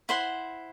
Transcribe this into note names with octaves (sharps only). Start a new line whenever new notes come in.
E4 C5 F#5 C6